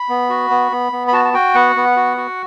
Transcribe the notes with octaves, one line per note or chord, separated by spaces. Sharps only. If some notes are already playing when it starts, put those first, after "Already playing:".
Already playing: B5
B3
F#4
B3
B3
B3
B5
F#4 A5
A5
F#4 G5
B3 F#5
B3
F#4
F#4